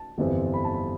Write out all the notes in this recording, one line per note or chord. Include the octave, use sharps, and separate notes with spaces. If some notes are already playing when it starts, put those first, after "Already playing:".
Already playing: A5
G1 F2 E3 G3 C4
B5
A5
B5